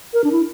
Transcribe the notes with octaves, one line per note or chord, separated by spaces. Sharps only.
A#4
D4
E4